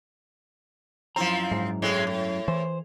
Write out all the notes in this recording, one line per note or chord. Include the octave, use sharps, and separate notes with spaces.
F#2 F3 C4 E4 A#5
G#2
A2 G#3 C4
A2
E3 C5